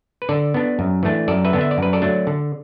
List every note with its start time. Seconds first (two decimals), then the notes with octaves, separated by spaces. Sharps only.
0.22 B4
0.29 D3 A4 D5
0.54 B3 D4
0.79 F#2
1.03 E3 A3 D4
1.28 F#2 A4 D5
1.45 B4 E5
1.53 D3 B3 D4
1.61 E5
1.71 D5
1.78 F#2 B4
1.93 A4 D5
2.02 F#3 A3 D4
2.27 D3